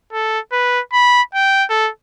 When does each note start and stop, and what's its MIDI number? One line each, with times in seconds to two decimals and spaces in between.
0.13 0.39 69
0.52 0.80 71
0.93 1.22 83
1.35 1.64 79
1.70 1.90 69